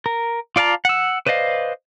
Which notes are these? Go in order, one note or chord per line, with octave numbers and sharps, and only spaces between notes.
A#4
F4 D5 F5 A5 A#5
F#5 E6
B4 C5 D5 D#5 F5